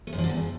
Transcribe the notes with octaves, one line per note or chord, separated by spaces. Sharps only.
A3
F#2
F3
D3
E2